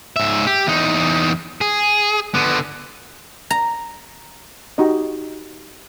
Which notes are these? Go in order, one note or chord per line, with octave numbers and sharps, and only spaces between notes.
G#2 E5
G4
E2 D#4
G#4
D3 B3
A#5
D#4 F#4 G4 D#5